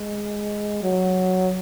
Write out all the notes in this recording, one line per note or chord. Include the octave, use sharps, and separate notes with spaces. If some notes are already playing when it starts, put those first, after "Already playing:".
Already playing: G#3
F#3